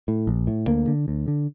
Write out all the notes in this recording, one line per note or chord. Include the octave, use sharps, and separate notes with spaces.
A2
A#1
A2
D2 A#3
D3
D2
D3